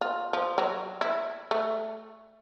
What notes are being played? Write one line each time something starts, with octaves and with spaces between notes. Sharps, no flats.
F4
F3
F#3
E4
A3